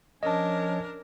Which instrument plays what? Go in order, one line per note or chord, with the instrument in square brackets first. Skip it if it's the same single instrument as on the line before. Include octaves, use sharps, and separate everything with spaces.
[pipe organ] F3 C#4 C#5 [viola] D4 A#4 [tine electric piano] D#5 A5